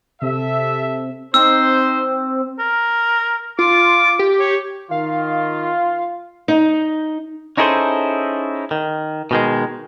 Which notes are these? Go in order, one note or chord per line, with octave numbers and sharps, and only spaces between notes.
C3 A4 E5
C4 D#4 C5 E6
A#4
F4 D6
G4
C#5
D#3 F4 F5
D#4
C#4 D#4 E4 G#4 A4 C5
D#3
B2 D#3 G#3